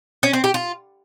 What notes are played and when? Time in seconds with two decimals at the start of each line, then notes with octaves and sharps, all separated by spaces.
0.23 C#4
0.33 C4
0.44 G4
0.54 F4